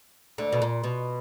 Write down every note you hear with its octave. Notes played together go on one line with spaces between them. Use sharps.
D2 D3
B2
A#2
B2